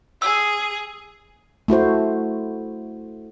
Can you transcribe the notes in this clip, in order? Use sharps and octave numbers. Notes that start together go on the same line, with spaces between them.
G#4 E6
A3 E4 F#4 C5